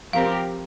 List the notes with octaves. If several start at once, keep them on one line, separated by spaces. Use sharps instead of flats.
F3 C4 G4 A#4 F5